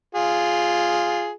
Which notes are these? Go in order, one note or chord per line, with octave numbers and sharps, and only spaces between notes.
F4 G#4